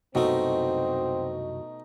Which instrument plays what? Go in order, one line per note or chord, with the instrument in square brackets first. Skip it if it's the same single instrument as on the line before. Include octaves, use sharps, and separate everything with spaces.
[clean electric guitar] C2 F#2 F#4 [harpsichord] B2 A3 [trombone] C4 [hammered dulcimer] D#4